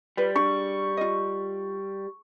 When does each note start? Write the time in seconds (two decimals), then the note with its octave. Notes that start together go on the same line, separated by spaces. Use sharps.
0.17 G3 F4 B4
0.36 D4 C#6
0.97 F4 D#5